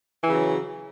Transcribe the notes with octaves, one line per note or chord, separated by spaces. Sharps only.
C#3 E3 F#3